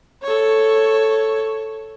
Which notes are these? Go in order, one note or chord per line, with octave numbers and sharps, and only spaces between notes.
A4 C#5